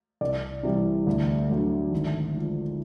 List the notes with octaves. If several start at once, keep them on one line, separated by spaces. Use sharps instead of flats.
C2 D5
C3 E3 G3
D2
D3 F#3 A3
G#1
G#2 F3